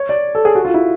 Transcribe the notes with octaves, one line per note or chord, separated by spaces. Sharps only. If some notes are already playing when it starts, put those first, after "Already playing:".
Already playing: C#5
D5
A4
G#4
F#4
F4
E4